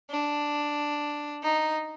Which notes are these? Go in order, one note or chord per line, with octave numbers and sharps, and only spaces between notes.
D4
D#4